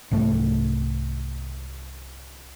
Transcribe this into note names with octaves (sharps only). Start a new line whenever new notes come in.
C2 G#2 A3